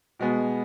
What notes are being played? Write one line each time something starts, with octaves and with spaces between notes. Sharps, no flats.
B2 G#3 B3